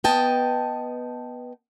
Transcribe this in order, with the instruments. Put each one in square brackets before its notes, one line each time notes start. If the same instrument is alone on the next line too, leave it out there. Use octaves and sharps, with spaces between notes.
[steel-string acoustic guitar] B3 D#5 G5 A5